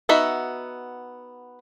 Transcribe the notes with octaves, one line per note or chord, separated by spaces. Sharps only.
B3 D#4 F#4 E5